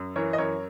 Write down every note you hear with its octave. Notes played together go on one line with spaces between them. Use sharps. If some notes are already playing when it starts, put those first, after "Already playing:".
Already playing: F#2
E3 A#4 C#5
D#5
F#2 A#4 C#5